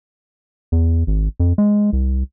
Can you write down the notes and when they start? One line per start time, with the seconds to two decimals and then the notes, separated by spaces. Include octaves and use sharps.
0.72 E2
1.07 G#1
1.40 F2
1.58 G#3
1.93 C2